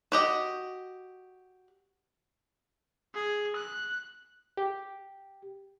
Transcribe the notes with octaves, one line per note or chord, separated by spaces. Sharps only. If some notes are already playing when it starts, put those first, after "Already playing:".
F#4 G4 D#5
G#4
F#6
G4